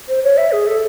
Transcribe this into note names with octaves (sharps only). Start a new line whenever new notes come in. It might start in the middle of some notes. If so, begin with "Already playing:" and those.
C5
C#5
E5
G#4
A4